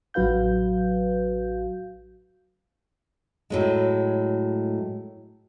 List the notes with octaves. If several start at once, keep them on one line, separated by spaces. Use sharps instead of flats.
A1 F#3 F#4 B4 F5 G6
A2 F#3 G#3